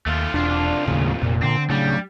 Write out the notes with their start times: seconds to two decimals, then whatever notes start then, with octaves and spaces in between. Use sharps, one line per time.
0.06 D#2 A3 F4
0.34 E1 C2 D4 F4
0.88 D#2 A2 C#3
1.22 F1 A#2
1.42 D3 C4
1.70 C#3 F#3 G3 A3 D4